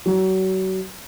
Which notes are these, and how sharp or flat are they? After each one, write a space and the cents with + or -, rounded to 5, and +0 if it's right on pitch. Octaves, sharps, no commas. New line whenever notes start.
F#3 +35